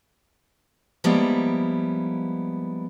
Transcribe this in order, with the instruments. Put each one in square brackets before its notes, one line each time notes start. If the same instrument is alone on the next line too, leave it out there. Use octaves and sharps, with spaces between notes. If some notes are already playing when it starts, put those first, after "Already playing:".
[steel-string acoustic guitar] F3 G3 G#3 A#3 B3 E4